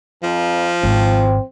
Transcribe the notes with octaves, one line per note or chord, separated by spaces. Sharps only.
F2 F3
G#1 C4